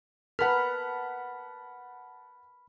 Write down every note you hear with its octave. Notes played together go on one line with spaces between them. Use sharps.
A#4 B4 F#5 A5 B5 F6 B6